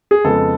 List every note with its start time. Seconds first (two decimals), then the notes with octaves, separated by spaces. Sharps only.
0.11 G#4
0.24 F2 C#3 G#3 B3 A4